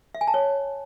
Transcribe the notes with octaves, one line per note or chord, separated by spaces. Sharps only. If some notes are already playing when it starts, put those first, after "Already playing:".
E5
G#5
A5
C#5